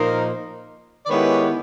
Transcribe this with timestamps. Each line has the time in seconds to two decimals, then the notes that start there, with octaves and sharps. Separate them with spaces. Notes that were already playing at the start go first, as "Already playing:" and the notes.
Already playing: A#2 F3 A#3 D#4 A#4 C5
1.06 D5
1.10 D#3 G#3 B3 E4 G4 B4 C#5